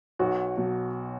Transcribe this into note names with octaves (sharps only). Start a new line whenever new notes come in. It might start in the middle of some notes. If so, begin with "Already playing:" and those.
B1 F#4
B2 F#3